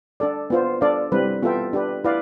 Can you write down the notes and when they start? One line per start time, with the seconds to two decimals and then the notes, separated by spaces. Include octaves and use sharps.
0.20 D4 A4 D5
0.50 B3 F4 C5
0.81 D4 A4 D5 F5
1.12 G3 C4 E4 B4
1.42 B3 F4 A4 E5 G5
1.73 D4 G4 B4
2.04 E4 B4 D5 F5